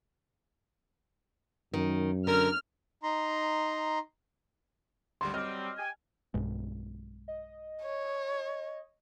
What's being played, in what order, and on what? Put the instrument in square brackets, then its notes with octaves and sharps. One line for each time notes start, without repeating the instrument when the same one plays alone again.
[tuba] F#2 [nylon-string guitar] D#3
[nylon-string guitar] D3 [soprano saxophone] A#4 [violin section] F6
[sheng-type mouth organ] D#4 A#5 C6
[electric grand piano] G#1 D2 G3 [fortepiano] C6
[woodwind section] F#3 G3 C4 [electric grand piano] D#5 [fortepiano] F6
[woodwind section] G4 G5 G#5
[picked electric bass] B1 G2 G#3
[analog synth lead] D#5
[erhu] C#5